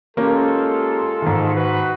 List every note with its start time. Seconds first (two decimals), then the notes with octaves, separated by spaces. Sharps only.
0.17 G#3 A#3 C#4 F4 G4 A4
1.22 G#2 D#3
1.54 F#4 B4